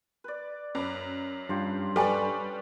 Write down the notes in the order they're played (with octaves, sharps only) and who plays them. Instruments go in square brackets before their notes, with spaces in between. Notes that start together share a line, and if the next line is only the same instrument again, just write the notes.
[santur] B4 D5
[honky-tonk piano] F#2 [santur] B4 B5 D6
[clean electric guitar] G2 [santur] F4 G4
[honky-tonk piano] G3 B4 [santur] C#4 D4 D5 [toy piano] A4 G5 G#5